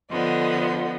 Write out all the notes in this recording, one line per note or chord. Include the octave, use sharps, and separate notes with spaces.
D3 F3 B3 D#5